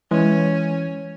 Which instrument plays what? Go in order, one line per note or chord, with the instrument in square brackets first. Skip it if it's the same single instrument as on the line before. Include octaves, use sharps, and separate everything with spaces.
[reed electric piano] E3 [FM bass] G#3 [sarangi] C#4